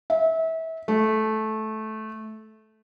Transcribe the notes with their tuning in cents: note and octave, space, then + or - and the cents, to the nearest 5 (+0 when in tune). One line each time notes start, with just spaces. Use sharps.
E5 -30
A3 -15